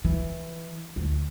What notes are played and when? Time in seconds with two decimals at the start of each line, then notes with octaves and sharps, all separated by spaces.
0.05 E3
0.96 D2